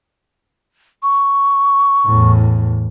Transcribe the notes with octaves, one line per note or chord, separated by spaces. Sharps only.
C#6
E2 A2